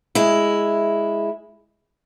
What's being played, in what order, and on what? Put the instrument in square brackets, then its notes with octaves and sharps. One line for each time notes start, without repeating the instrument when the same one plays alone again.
[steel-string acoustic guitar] G#3 E4